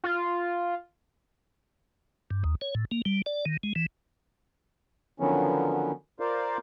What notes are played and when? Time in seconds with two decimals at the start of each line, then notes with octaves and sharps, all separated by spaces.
0.04 F4
2.31 G2
2.44 D#2
2.61 C#5
2.75 A2
2.91 A#3
3.05 G3
3.26 D5
3.46 D#3
3.63 G#3
3.76 E3
5.20 D3 D#3 F3 F#3 B3 C#4
6.20 F4 A#4 C5 D5 F5